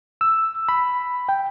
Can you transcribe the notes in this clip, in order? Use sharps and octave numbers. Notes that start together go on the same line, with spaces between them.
E6
B5
G5